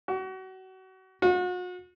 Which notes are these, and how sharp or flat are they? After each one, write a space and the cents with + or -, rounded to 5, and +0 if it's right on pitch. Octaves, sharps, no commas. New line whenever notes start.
F#4 +30
F#4 -40